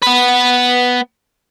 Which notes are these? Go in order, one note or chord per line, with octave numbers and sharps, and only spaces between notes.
B3 B4